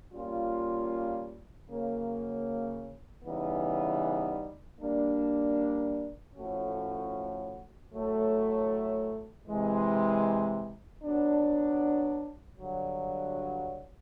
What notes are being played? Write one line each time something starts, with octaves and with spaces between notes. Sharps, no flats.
G3 A#3 C#4 F4
C#3 F#3 A#3
C#3 E3 G3 B3 D#4
G3 A#3 D4
A2 F3 A3 C#4 F#4
A2 F#3 A3
C3 E3 G#3
F#3 B3 D4
G2 D3 F#3